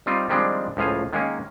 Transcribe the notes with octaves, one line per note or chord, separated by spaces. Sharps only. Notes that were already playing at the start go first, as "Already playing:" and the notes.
G3 C4 D#4 F4
D#3 F3 G3 G#3 C4 D4
C#2 A2 F3 F5 G#5
D#3 G#3 A#3 C#4